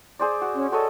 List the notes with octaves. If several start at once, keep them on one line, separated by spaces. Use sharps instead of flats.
G#4 C5 D5
F#4
C#4
F#4 A4 C#5 D#5